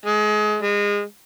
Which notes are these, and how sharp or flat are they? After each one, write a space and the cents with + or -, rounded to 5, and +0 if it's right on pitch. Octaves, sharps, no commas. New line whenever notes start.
G#3 +30
G#3 -25